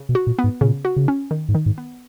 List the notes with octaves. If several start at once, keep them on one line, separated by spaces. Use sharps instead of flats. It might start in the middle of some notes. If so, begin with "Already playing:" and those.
Already playing: C#3
B2
F#4
A#2
B3
G#2
A#2 C#3
F#4
C#3
C#4
D#3
G#2
D#3
G#2
B3